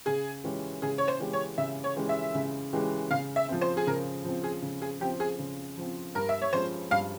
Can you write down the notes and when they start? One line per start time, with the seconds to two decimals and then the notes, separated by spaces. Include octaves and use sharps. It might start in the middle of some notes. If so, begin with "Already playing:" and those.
0.06 C#3 G#4
0.44 E3 G#3 C#4 G4
0.82 C#3 G#4
0.98 C#5
1.08 C5
1.20 E3 G#3 C#4 G4
1.33 C#5
1.58 C#3 E5
1.84 C#5
1.96 E3 G#3 C#4 G4
2.09 E5
2.35 C#3
2.73 E3 G#3 C#4 G4
3.11 C#3 F5
3.36 E5
3.49 F3 C4
3.61 C5
3.77 G#4
3.87 C#3 A#4
4.24 F3 C4
4.44 G#4
4.62 C#3
4.82 G#4
5.00 F3 C4 G4
5.20 G#4
5.39 C#3
5.77 F3 C4
6.15 G2 A#4
6.29 E5
6.41 C#5
6.53 F3 G#3 C#4 C5
6.91 G2 F5